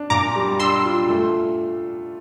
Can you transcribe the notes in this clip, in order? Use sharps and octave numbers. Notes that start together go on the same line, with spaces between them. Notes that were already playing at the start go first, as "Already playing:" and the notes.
Already playing: D4
A#2 A#5 D6
G3
D4 C6 E6
F4
A3